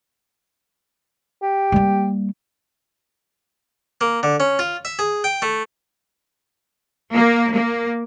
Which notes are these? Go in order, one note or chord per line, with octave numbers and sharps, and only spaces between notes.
G4
G3 A#3
A#3
D3
C#4
F4
E5
G#4
G5
A3
A#3
A#3